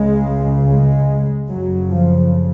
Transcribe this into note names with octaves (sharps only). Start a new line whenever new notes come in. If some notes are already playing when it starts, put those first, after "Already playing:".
Already playing: C#2 C#3 G#3
G#3
F#1 F2 C#3 F#3
F3